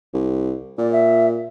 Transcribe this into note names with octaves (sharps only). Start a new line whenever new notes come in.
C2
A#2 D5
E5